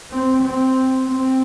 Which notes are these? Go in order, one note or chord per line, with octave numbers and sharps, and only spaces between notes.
C4
C4
C4